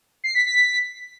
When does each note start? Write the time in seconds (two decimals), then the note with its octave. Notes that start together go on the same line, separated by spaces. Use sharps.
0.24 C7
0.35 B6
0.46 B6